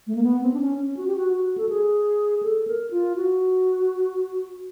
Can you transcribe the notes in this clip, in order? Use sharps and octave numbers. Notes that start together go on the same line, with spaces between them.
A3
A#3
B3
C4
D4
C#4
C#4
F#4
G4
F#4
F#4
A4
G#4
A4
A#4
F4
F#4